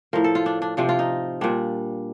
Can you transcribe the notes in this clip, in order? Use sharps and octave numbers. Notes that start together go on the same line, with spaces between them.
A2 F3 A#4
A4
F4
D4
D4
C3 F3 D4
F4
D#4
A#2 G3 D4